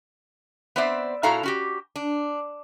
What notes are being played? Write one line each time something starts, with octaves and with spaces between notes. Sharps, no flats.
B3 C4 C5 D5 E5
A#2 E4 F#4 A4 F5 A#5
C#4 F#4 G4
D4